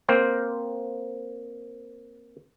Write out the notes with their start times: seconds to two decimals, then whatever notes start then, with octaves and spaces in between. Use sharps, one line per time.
0.08 A#3 C4 A#4 C5 G5